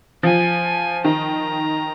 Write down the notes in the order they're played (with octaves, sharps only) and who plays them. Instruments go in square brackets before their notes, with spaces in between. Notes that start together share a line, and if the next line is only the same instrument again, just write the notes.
[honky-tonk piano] F3 [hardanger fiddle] G#5
[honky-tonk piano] D#3 [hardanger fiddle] A#5